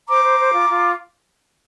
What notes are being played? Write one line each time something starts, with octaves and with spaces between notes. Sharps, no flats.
C5 A#5 D6
C5
C5
F4
F4